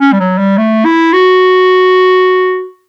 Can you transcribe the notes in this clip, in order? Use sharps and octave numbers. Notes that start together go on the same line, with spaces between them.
C#4
G3
F#3
G3
A3
E4
F#4